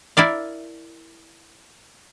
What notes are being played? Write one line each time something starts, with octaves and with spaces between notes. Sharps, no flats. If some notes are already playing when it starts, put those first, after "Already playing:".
E4 A#4 D5 F5